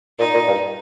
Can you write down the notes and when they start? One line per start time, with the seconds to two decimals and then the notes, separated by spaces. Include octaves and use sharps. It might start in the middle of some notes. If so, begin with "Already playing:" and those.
0.19 A#2 D#4
0.34 A#2
0.47 G2